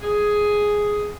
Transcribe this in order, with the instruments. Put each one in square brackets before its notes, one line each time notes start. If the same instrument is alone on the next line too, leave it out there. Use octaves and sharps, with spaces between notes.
[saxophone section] G#4